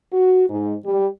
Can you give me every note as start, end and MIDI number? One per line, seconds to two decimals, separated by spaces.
0.12 0.43 66
0.50 0.73 44
0.85 1.07 55